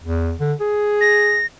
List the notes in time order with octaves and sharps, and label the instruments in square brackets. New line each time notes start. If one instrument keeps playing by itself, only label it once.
[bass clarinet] E2
D3
G#4
[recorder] A#6